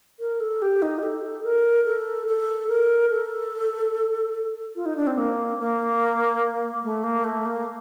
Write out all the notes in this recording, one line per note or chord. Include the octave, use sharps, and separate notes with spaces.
A#4
A4
G4
D#4
G4
A4
A#4
A4
A4
A#4
A4
F4
D#4
D4
C4
A#3
A#3
A3
A#3
A3
A#3